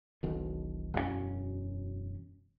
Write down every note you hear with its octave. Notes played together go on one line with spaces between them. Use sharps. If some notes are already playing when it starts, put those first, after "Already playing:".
E1 B1 B2 D#3
E1 F#2 F3 C#4